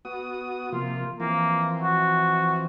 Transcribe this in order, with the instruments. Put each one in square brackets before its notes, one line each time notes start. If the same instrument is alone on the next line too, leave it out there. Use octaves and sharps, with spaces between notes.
[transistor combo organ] B3 F#4 D#6
[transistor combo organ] C3 F3 A#3 [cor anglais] F4
[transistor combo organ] E3 F3 C4 [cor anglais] A#3
[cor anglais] F#4